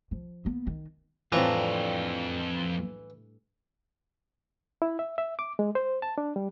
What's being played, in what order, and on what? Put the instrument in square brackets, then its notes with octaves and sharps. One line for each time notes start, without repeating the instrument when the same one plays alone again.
[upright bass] F3
A#3 B3
D#3
[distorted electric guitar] F2 A#5 [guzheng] A2 G3 D4 [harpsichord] E3 [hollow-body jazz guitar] C4 F4
[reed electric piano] E4
E5
E5
D6
G#3
C5
A5
D4
G3